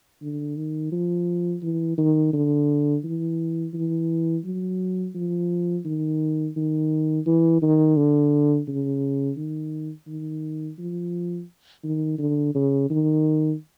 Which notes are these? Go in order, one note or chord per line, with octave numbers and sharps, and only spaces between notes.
D3
D#3
F3
E3
D#3
D3
E3
E3
F#3
F3
D#3
D#3
E3
D#3
D3
C#3
D#3
D#3
F3
D#3
D3
C#3
D#3